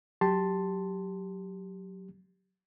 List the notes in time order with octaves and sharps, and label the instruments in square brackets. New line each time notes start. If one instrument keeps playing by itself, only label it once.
[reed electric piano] F#3 G4 A5 C6